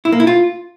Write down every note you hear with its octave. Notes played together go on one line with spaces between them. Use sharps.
E4
A#3
E4
F4